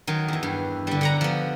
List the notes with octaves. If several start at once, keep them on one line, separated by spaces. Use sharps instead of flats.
D#3 F#3
E2 E3
G2
D3 G3
D3 F#5 A#5
F3 B3